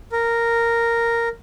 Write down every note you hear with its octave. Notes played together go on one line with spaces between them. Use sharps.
A#4